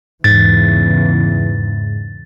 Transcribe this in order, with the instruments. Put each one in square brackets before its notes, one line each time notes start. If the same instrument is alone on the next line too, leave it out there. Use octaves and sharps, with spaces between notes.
[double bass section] E2 C#3 E3 [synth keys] G#2 [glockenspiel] A6